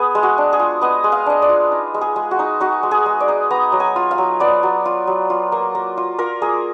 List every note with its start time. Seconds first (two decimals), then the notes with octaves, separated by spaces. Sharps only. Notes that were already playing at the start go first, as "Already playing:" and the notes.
Already playing: B3 G#4
0.15 G#3
0.23 F#4
0.38 D4
0.53 G#4
0.59 F4
0.81 B3 D#5
1.04 G#3
1.12 F5
1.26 D4 D#5
1.42 D5
1.49 F4
1.72 D#4
1.94 G#3
2.01 G#4
2.16 G#3
2.31 F#4
2.39 D#4
2.60 D#4 F#4
2.83 G#3
2.91 G#4
3.06 G#3
3.20 D5
3.28 D#4
3.51 B3 A#5
3.72 F#3
3.80 G#5
3.96 F4
4.11 F5
4.18 F#3
4.40 B3 D5
4.63 F#3
4.85 F4
5.07 F#3
5.30 F4
5.52 A#3
5.75 A#3
5.97 F4
6.19 F4 A#4
6.42 A#3 G#4